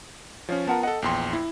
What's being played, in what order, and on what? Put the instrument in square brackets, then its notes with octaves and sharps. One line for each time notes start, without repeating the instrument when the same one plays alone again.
[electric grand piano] F3 C#4 [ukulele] C#5 F5
[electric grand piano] B3 F4 A#4 [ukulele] F#5 A5
[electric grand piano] A4 D#5 [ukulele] F#5
[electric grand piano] A#1 E2 C6 [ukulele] G5
[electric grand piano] E4